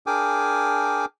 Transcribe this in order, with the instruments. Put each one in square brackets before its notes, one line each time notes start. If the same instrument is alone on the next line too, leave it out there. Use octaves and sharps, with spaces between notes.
[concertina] D4 G#4 A#4 G5 G#5 D6